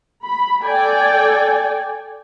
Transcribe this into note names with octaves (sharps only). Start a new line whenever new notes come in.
B5
A4 D5 G5 G#5